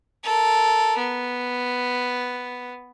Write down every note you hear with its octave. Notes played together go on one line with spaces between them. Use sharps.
A4 A#4
B3